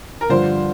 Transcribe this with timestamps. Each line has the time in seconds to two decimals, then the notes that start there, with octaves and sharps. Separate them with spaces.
0.21 A#4
0.29 G2 D3 F3 D4 F4 C5